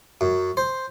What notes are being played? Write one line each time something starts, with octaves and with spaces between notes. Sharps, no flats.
F#2
C5